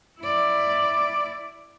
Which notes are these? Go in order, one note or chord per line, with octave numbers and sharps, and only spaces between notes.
E4 D5